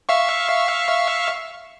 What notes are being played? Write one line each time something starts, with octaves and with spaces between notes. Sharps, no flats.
E5 F5 C#6